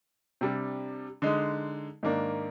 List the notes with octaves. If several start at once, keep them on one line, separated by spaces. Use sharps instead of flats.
C3 G3 D4
D3 G#3 D#4
G#2 D#3 A#3 D4